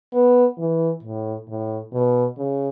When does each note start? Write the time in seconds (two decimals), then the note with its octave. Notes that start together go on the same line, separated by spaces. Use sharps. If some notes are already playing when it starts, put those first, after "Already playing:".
0.13 B3
0.58 E3
1.03 A2
1.48 A2
1.93 B2
2.38 C#3